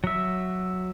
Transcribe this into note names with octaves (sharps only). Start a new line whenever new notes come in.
F#3 E5